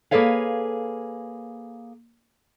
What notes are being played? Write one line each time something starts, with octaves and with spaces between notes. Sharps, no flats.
A#3 G#4 A4 B4 C#5 F5